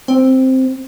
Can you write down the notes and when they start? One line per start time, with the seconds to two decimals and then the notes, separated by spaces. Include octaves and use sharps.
0.08 C4